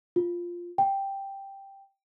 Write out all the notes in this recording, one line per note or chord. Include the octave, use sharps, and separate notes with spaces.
F4
G5